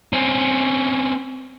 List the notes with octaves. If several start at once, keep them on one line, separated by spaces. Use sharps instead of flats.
C4 C#4